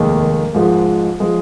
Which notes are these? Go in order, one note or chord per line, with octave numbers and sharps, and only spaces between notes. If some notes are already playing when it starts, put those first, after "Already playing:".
Already playing: F1 D#2 D#3 G#3
G#2 F3 G#3
F3 G#3